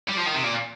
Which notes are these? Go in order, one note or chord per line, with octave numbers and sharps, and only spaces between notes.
G3
F3
D#3
C3
A#2